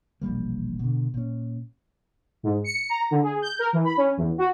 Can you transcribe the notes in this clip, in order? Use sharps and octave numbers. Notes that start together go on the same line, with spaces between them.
E1 A#1 G3 A#3
B2 D3
A#2 C#4
G#2
C#7
A#5
D3
G#4
G6
A#4
E3
B5
C#4
E2
F#4